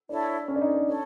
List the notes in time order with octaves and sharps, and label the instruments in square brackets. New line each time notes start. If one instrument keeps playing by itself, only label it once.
[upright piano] D4 [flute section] E4 A4 C#5
[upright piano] C#4
D4
D#4
D4
[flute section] A4 C#5